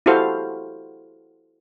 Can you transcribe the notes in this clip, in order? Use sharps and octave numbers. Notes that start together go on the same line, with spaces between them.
E4 F#4 G4 A4 C5 F5